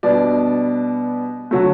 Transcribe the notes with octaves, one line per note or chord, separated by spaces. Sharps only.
B2 G3 B3 D4 D5
D3 F#3 A3